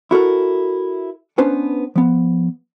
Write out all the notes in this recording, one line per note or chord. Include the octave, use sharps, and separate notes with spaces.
E4 F#4 A4 A#4
B3 C#4 D4 B4 C5
F3 B3